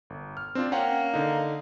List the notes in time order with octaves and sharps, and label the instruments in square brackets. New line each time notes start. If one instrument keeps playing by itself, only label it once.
[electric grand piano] G1
F6
C4 D4 F4
[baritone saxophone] A#3 [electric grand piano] C#4 F#5 G5
[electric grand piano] D3 D#4